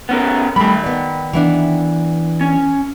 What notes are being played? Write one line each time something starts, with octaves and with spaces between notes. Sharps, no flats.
B3 C#4 A#4
D#3 G3 A3 B5
B3 D5
E3 B3 D4
C#4